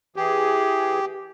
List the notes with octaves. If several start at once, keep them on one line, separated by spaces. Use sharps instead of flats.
E3 G4 G#4